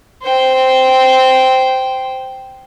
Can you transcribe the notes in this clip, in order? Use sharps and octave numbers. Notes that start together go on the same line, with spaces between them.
C5 G5